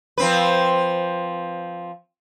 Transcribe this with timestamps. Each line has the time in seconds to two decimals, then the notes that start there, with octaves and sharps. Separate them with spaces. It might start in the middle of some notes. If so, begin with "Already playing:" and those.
0.18 F3 C4 B4